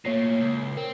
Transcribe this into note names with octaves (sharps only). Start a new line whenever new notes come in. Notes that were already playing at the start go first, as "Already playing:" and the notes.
A#2 A3 A#3 C#5 C7
C#2
C4 A#4